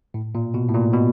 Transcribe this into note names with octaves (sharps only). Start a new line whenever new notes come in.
A2
A#2
B2
A2
A#2
B2